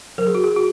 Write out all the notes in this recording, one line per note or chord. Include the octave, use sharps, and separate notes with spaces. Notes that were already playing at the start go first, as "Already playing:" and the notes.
F#3 A#4
G#4
F#4
G#4
F#4